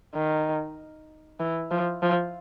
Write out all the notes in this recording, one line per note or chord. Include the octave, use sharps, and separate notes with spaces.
D#3
E3
F3
F3